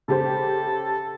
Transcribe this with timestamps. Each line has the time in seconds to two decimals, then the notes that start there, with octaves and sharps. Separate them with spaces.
0.08 C#3 G4 A4 C5